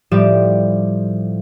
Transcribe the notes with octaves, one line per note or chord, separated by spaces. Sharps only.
A2 F3 G3 G4 D6 E7